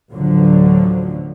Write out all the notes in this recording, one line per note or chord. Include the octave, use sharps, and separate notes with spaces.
A1 D2 D3 F3 F#3